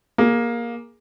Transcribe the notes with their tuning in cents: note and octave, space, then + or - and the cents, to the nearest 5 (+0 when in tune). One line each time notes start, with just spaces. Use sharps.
A#3 +15 G#4 +0